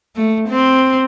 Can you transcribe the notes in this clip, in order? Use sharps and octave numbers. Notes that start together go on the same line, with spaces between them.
A3
C4